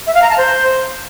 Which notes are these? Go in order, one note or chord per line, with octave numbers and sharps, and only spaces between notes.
E5
F5
A#5
A5
C5